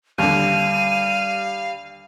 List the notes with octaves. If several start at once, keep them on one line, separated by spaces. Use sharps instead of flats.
D#2 D3 G3 F5 D#7